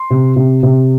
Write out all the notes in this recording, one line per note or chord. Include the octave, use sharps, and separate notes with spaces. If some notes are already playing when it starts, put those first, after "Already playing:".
Already playing: C6
C3
C3
C3